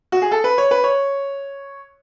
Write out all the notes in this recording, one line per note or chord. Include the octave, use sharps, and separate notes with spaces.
F#4
G#4
A4
B4
C#5
B4
C#5